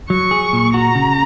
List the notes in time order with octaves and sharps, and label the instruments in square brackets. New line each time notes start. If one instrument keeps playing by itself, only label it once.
[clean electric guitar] F#3 [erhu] C#6
[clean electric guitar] G#4
A#2
[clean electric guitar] F#4 [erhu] A#5
[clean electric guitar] C#3